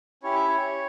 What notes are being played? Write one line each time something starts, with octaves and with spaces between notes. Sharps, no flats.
C#4 E4 G4 C#5
E5
C#5